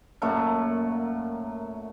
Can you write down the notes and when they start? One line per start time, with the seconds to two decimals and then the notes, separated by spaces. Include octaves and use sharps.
0.22 F#2 A#2 A3 F#5